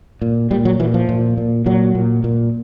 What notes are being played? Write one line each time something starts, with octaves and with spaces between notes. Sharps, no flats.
A#2
A#2 G3
F#3
A#2 E3
F3
A#2
A#2
A#2 F#3
A#2
A#2